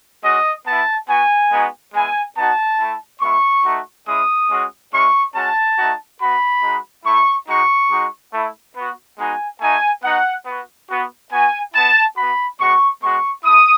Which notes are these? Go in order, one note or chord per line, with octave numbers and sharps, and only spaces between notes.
G#3 C#4 F#4 D#5
B3 E4 A5
B3 F#4 G#5
G#3 B3 D#4 F#4
G#3 B3 E4 G#5
B3 D#4 F#4 A5
A3 E4
G#3 B3 E4 C#6
A3 D#4 F#4
G#3 C#4 E4 D#6
G#3 C#4 F#4
G#3 C#4 E4 C#6
G#3 C#4 F#4 A5
A3 D#4 F#4
B3 F#4 B5
G#3 D#4 F#4
A3 E4 C#6
G#3 D#4 F#4 C#6
G#3 D#4 F#4
A3 E4
B3 F#4
G#3 B3 D#4 F#4 G#5
A3 D#4 F#4 G#5
B3 D#4 F#4 F#5
B3 F#4
B3 F#4
B3 F#4 G#5
B3 E4 A5
B3 F#4 B5
G#3 B3 F#4 C#6
G#3 B3 F#4 C#6
A3 E4 D#6